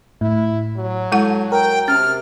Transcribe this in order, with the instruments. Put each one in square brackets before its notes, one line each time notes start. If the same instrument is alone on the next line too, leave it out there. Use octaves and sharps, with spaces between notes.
[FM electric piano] A2 [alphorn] E4
[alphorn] F#3
[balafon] G#3 E4 F#5 [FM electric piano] A4
[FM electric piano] A#4 [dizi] G5
[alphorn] C3 [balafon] C#4 [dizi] F6